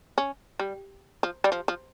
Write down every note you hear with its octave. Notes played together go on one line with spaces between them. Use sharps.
C#4
G3
F3
G3
F3
F3